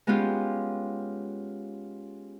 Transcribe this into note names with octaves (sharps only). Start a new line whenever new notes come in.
G#3 B3 C#4 F4 G4